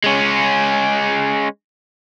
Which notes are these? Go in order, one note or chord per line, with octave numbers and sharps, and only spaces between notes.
G#3 C#4